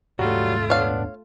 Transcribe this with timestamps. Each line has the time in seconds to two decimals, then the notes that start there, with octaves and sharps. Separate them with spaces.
0.19 D#1 G#2 F#3 G3 A3 F4 F#4
0.70 B3 D4 C#5 F5